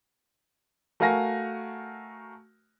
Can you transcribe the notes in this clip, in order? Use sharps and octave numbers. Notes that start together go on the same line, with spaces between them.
A3 F#4 A#4 F5 G#5 A#6